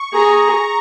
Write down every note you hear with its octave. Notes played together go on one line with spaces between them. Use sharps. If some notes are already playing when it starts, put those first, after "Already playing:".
Already playing: C#6
G#4 A#5